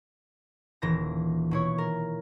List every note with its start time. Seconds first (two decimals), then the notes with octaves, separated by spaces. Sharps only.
0.82 D#1 E3 A#6
1.51 B2 E4 C#5
1.78 A#4